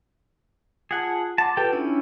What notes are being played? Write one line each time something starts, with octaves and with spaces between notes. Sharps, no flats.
F4 G#4 F#5 A5
F#5 A5 C6 D6
F4 G4 A4 B4 G5
C#4 D4 E4